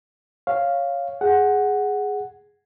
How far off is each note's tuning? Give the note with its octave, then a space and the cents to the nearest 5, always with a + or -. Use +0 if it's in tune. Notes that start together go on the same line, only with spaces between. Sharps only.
C#5 +0 F5 +0
G#4 +0 F#5 +0